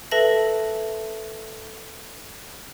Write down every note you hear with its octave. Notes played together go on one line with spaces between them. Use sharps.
A4 B4 E5 A5 A#6 F#7